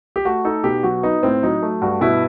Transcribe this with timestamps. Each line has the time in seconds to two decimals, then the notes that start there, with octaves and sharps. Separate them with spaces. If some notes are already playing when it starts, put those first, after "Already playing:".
0.16 G4
0.25 A3 F#4
0.45 D#4 A4
0.64 B2 G4
0.83 F#3 F#4
1.03 B3 D#4
1.23 A2 C4
1.43 F#3 D#4
1.62 A3
1.82 G2 F#4
2.01 B2 E4